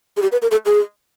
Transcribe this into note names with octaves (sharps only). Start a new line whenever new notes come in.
G#4
G4
B4
A#4
A4
G#4